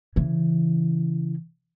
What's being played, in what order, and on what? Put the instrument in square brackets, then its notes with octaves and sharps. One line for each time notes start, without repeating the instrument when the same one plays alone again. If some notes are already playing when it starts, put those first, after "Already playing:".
[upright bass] C#3 E3